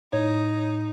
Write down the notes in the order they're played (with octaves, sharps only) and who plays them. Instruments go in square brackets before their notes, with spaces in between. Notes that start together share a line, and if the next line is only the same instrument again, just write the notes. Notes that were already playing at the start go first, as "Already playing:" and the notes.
[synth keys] A2 [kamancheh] D#4 [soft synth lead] C#5